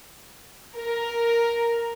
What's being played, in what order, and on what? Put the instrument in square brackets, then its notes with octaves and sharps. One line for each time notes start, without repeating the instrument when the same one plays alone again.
[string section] A#4